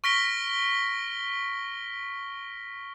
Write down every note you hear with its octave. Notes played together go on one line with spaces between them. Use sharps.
C#6 F6 A#6 B6 D7 G7